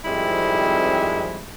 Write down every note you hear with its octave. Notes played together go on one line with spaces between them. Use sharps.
F2 D#3 G3 G#3 C4 E4